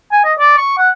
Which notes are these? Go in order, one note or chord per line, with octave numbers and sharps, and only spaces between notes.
G#5
D#5
D5
C#6
F#5